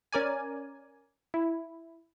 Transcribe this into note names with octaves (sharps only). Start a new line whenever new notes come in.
C#4 A#4 D5 G#5
E4